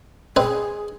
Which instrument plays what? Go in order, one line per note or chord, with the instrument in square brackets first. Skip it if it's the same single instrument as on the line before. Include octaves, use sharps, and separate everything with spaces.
[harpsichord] C4 B4 D#5 [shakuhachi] G#4